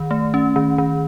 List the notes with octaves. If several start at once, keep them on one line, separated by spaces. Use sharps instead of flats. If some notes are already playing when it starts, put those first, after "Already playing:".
Already playing: D#3
A3
C#4
D#3
D#3